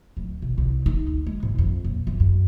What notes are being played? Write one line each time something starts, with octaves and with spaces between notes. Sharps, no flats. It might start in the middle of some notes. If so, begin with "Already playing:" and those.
D1
B1
C2
D#4
D2
G#3
G#2
F2
D#1
G1
F#2